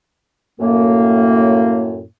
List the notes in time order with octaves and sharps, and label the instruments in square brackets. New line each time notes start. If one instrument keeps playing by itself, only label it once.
[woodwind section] F#2 A2 A#3